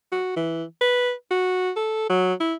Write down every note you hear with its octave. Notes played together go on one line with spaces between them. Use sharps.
F#4
E3
B4
F#4
A4
F#3
E4